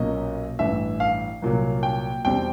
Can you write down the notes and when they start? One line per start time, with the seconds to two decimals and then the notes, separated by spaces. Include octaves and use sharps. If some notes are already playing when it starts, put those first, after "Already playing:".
Already playing: B1 A#2 F#3 A#3 C#4 D#5
0.59 A1 G2 E3 E5
1.00 F5
1.42 C2 A#2 F#3
1.83 G5
2.25 E2 B2 G3 C4 G5